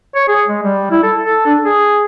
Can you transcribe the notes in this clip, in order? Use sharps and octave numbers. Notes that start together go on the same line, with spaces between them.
C#5
G#4
G#3
G3
E4
A4
A4
D4
G#4